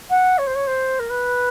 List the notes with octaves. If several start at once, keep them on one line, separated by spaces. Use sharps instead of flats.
F#5
C#5
C5
C#5
C5
A#4
B4